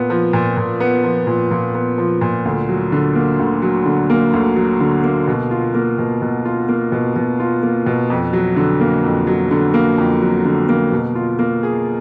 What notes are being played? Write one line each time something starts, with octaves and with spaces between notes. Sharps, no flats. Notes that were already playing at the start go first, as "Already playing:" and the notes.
Already playing: A#2 B3
F3
A#2
A#2
B3
F3
A#2
A#2
B3
F3
A#2
D2
F#3
D3
A#3
D2
F#3
D3
A#3
D2
F#3
D3
A#3
B2
F4
A#3
B2
B2
F4
A#3
B2
B2
F4
A#3
B2
F2
F#3
D3
A#3
F2
F#3
D3
A#3
F2
F#3
D3
A#3
B2
F4
A#3
G#4